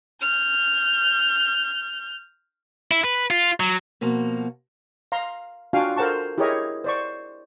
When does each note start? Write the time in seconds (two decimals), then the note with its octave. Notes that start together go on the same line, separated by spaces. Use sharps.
0.22 F6 G6
2.91 E4
3.04 B4
3.31 F4
3.60 F#3
4.01 B2 F3 A#3 F#4
5.12 F5 A#5 C6
5.73 D4 F4 F#4 F5 G5 G#5
5.97 A4 A#4 C5 F#5 A5 C#6
6.38 E4 G4 G#4 A#4 C#5 D#5
6.84 C5 D5 C#6